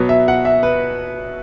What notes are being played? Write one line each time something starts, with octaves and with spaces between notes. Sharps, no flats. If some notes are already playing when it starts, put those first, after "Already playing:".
Already playing: B2 F#3 B3
E5
F#5
E5
B4